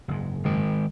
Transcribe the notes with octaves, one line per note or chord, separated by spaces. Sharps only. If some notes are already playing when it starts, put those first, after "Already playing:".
F#1 G#2
D#3 G#3 A#4